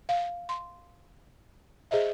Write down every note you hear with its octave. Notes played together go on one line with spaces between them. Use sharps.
F5
C6
G#4 C5 D#5 E5